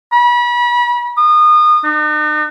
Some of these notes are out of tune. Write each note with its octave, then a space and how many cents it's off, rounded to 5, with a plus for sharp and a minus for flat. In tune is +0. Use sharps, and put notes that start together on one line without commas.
B5 -35
D#6 -30
D#4 -45